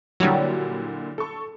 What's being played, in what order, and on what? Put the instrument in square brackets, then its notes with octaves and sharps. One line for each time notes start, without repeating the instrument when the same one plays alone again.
[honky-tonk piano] A#2 D3 E4 [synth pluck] F#3 G3
[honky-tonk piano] A4 C#6